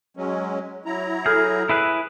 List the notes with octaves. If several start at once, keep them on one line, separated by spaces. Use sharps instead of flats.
F#3 G#3 C#4
F#3 E4 A#5
G#4 A4 F6 G6
E4 G#4 B4